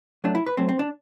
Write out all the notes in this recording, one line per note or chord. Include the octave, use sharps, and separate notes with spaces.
F#2 F#3 A3 D4
E4
B4
F#2 F#3 A3 C4
C4
D4